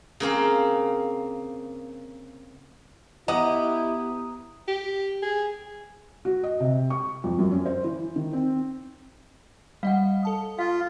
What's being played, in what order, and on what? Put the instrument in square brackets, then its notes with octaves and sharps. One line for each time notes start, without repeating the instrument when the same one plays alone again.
[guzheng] C#3 A#3 C4 C#4
[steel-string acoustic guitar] B3 G4 [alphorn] E4 [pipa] D#5 F#5 [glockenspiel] A#5 D#6 D#7
[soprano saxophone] G4
G#4
[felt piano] F#4
D#5
C3
C#6
F2
F#2
C#4
C5
E3
D#3
C4
[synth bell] G3 D#5 [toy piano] F5 F#5
[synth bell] A4 A5 D#6
[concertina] F4 [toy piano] F5